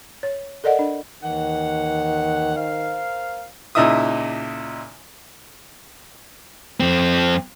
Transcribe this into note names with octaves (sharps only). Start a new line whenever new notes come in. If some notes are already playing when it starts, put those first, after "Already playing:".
C#5
A4 A#4 D5 D#5 F#5
D4
D#2 D#3 E3 F#5
A#4 C5 F5
C#2 A#2 D#4 E4 E5 D#6
F2 C4